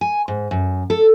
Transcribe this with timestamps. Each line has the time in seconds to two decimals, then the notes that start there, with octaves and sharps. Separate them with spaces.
0.01 G#5
0.28 G#2
0.51 F#2
0.90 A4